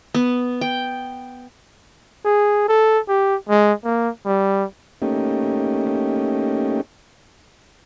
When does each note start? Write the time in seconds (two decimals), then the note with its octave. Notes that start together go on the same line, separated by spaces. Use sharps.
0.14 B3
0.61 G5
2.25 G#4
2.69 A4
3.09 G4
3.49 G#3
3.84 A#3
4.26 G3
5.02 A3 A#3 C#4 D#4 G4